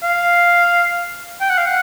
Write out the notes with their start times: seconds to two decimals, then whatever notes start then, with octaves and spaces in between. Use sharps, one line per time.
0.03 F5
1.41 G5
1.49 F#5
1.58 F5
1.67 F#5